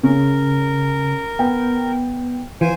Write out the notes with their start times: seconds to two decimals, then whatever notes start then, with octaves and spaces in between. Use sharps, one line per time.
0.03 C#3 C#4 A#4
1.39 B3 G5
2.61 E3 C5 F5 G#5